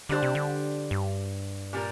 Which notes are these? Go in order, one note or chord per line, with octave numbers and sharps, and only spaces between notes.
D3 G3 D4 G4 C5
C3
D3
G2
A#2 G3 D4 A#4